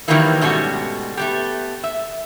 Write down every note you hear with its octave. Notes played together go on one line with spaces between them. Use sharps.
D#3 E3 F#3 G3 A#3 E4
G#2 B2 G3 A3 C#4 F#4
A3 B3 G4
E5